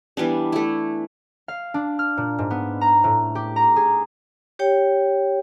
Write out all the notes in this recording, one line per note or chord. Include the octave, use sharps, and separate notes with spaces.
E3 G3 B3 D4
A3 E4
F5
D4
F6
A#2
G#2
B3
A#5
A2
G4
A#5
G#4
G4 C#5 G5